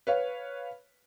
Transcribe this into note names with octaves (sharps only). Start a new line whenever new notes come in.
B4 C#5 F5